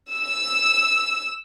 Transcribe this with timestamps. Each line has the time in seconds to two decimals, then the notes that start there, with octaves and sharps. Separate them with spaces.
0.11 E6